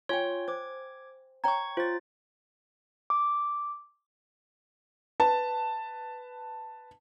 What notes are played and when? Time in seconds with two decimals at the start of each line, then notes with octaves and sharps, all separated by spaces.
0.09 F4 C#5 G5 G#5 C6
0.48 C5 D6 G#6
1.44 C#5 G5 A#5 C#6 G#6
1.77 F4 C5 A6
3.10 D6
5.20 B4 A5